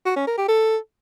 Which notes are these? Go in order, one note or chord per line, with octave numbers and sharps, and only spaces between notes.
F#4
C#4
A#4
G4
A4